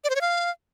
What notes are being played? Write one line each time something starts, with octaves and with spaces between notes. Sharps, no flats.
D5
C5
C#5
F5